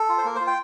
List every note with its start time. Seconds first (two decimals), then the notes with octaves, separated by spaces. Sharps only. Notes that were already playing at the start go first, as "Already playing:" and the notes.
Already playing: A4
0.09 F4
0.18 C5
0.25 A#3 A#4
0.36 C5
0.41 F4
0.47 G5